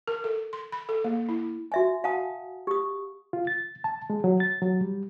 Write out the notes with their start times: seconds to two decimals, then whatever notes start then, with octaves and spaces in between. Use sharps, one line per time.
0.08 A#4
0.24 A4
0.53 C6
0.72 B5
0.89 A4
1.04 A#3
1.29 E4
1.72 F#4 E5 G#5
2.04 F5 F#5 G#5 A5 D#6
2.67 G4 D#6
3.33 F4
3.47 A6
3.84 A5
4.10 G#3
4.24 F#3
4.40 A6
4.62 F#3
4.81 G3